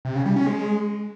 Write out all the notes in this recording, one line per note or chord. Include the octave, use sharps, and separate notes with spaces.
C3
C#3
G3
C#4
G#3